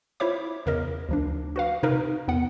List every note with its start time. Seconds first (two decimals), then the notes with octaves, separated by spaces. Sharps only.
0.20 E4 F4 C5 C#5 E5 D6
0.66 E2 C#3 A#4 D#5
1.09 D2 F3 D4
1.56 F#4 B4 F5
1.83 C3 D#4 A#4 B4
2.28 E2 B3 F#5